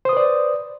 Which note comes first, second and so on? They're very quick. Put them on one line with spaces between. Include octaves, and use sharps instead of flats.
C5 D#6 B4 D5